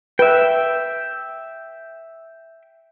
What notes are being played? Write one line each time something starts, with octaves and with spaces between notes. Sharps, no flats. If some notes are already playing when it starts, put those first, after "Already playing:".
B4 E5 G5